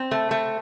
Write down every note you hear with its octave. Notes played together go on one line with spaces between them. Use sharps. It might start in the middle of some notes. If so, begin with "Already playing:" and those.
Already playing: C4
A3
A3